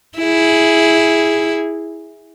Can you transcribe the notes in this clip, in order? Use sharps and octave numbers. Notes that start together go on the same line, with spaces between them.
E4 G#4